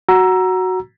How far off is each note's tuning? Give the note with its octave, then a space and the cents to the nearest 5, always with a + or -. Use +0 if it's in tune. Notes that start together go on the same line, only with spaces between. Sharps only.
F#4 +0 A#5 +10 E6 +15